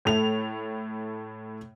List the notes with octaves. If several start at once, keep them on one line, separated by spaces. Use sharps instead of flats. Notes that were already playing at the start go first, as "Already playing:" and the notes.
A2 A3 F7